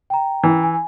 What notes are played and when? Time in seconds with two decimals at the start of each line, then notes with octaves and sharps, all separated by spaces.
0.10 G5 A#5
0.44 E3
0.63 G#5